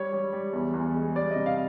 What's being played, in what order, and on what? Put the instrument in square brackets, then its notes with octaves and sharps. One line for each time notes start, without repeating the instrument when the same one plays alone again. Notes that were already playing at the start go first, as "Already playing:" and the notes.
Already playing: [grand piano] G3 C#5
G3
G3
E2
E2
G#3
G3 D5
D#5
C3
F5